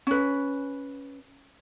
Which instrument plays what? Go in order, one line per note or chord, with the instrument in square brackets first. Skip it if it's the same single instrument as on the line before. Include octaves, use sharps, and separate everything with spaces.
[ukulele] C#4 B4